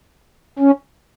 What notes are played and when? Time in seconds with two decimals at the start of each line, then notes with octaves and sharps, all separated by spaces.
0.59 C#4